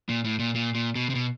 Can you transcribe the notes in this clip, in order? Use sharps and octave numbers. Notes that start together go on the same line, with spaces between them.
A#2
A2
A#2
A#2
A#2
B2
C3
B2